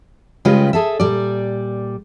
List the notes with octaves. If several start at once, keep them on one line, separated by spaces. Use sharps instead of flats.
C#3 G3 G#3 F4 G4 B4
G#4 A4 E5
A#2 G3 D5